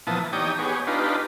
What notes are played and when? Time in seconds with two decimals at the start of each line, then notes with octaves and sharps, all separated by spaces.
0.07 A#2 E3 F3 B3 A5 D#6
0.20 E3
0.33 D#4 G4 C#5 D5 G5 D#6
0.59 B3 G4 G#4 C#5
0.87 D4 D#4 F4 G4 B4